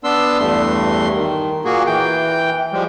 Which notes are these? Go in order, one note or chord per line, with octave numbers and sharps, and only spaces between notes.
B3 D4 C6 E6
E2 G2 A3 C6
D#3
A#2 A#3 F#4 G#4
E3 G5
F3 G3 G#3